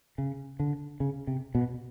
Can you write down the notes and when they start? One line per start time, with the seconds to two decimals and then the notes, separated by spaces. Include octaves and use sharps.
0.18 C#3
0.60 D3
1.00 C#3
1.27 C3
1.55 B2